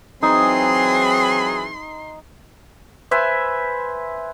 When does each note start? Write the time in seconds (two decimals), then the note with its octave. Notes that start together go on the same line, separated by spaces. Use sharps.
0.23 E3 F#3 C4 D#4 G#4 C6
3.11 B4 C5 E5 G#5